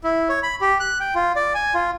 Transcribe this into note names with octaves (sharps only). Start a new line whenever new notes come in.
E4
C#5
B5
G4
F#6
G5
F4
D5
G#5
F4